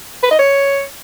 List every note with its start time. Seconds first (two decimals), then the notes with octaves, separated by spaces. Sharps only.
0.23 B4
0.31 D#5
0.39 C#5